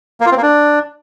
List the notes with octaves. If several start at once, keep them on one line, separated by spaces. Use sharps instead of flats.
A#3
F4
C4
A#3
D4